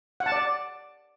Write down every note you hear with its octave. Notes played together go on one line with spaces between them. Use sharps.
F#5
A5
D5